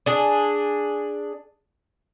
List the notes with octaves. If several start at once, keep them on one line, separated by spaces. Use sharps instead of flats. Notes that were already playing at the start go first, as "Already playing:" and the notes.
D4 G#4